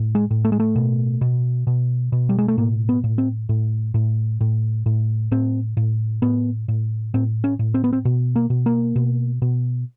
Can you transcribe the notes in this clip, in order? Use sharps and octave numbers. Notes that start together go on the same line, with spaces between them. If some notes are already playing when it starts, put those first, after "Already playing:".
Already playing: A2
G#3
A2
A3
G#3
A3
B2
B2
B2
B2
G3
G#3
A3
A2 A#3
B3
A2
C4
A2
A2
A2
A2
A2 C4
A2
A2 B3
A2
A2 C4
C#4
A2
C4
B3
C4
B2
A#3
B2
A#3
B2
B2